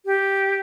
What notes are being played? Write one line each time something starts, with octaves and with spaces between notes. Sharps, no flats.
G4